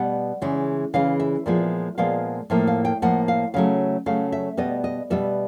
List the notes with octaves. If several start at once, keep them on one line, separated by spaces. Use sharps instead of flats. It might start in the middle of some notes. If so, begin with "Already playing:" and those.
Already playing: B2 G3 B3 F#5
C#3 E3 G#3
C#3 E3 G#3 F5
E5
A#2 F3 G#3 B3
A#2 F3 G#3 B3 F5
A2 F3 A#3 E5
F5
G5
A2 F3 A#3 F#5
F5
C#3 F#3 A3 F5
C#3 F#3 A3 F5
E5
B2 G3 B3 D#5
D#5
B2 G3 B3 E5